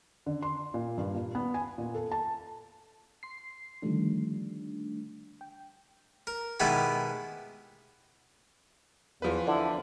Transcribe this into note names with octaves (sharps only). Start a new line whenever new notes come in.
D3
C6
A#2
G2
A#2
B3
G#5
A#2
A4
A5
C6 C7
D3 D#3 F3 G3 A3 D4
G5
A#4
B2 D#3 G#3 B3 E4 G4
E2 E3 F3 B4
D3 E4